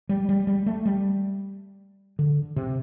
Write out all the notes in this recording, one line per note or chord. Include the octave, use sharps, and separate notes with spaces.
G3
G3
G3
A3
G3
D3
C3